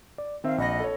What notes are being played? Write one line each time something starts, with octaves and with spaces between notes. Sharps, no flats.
D5
D#3 C4 E5 F5
A#1 D#5 F#5 B5 A#6
A4 C#5